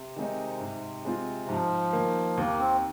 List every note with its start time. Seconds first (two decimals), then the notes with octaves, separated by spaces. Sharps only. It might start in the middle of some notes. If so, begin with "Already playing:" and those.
Already playing: C3
0.16 D#3 G#3 C4 D#4
0.60 G#2
1.05 G#3 C4 F4
1.49 G#2 F3
1.93 D#3 A#3
2.37 D#2 A#3
2.59 C4